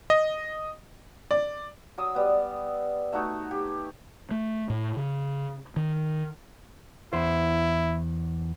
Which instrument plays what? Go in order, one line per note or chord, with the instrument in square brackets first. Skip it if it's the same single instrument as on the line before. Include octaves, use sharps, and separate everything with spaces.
[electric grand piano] D#5
[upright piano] D5
[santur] F#3 D#6 E6
G3 B3
A3 D#4 F#4 C#5
G4
[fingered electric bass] A3
A2
C#3
D#3
[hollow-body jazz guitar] E2 C5 [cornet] E4